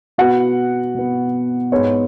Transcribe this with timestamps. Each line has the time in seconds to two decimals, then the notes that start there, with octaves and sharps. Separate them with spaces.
0.18 B2 B3 F#4 F#5
0.95 B2 B3
1.72 G#2 G#3 B3 C#5